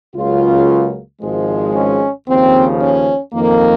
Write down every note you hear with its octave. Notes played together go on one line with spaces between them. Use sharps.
C#2 C#3 F#3 A#3 F4
G#1 G#2 F3 G#3
C#4
D#2 C#3 F3 C4
C#4
F2 D#3 A#3